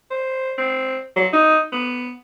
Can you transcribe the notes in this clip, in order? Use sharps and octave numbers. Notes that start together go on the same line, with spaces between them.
C5
C4
F#3
D#4
B3